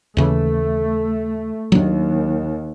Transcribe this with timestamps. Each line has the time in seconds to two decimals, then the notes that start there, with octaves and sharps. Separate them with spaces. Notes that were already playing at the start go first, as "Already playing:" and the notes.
0.17 D#2 C#3 E3 A3
1.72 D#2 F#3 A#3 D4